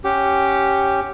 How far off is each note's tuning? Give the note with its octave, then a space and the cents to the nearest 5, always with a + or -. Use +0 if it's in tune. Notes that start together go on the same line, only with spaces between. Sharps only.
C#4 +0 G4 +0 F#5 +0